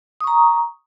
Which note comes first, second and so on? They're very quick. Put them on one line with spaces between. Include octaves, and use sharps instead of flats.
D#6 C#6 A#5